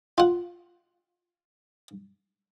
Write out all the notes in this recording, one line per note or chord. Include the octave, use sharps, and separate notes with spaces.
F4 F#5